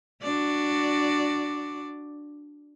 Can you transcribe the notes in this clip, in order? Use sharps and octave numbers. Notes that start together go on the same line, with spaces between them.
D4 F#4 D5